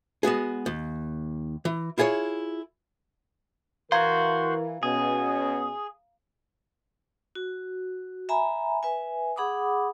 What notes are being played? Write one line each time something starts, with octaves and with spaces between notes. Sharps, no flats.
G#3 B3 F#4 G#4
D#2
E3
E4 F4 G#4 A#4 C#5
E3 F#4 A#4 C5 F5 A#5 G#6
B2 B3 C#4 G#4
F#4
E5 G#5 A#5 B5
B4 E5 G#5
G#4 F#5 B5 D6 D#6